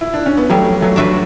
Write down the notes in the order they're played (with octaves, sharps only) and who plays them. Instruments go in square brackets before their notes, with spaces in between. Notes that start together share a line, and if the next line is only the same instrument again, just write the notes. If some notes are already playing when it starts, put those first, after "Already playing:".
[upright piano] E4
D4
C#4
B3
[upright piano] F#3 A3 [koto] G3
[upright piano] F#3 A3
[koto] D4 F#4 B4 E5